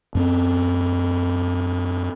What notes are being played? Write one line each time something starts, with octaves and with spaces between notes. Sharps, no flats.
F#2 B3 C4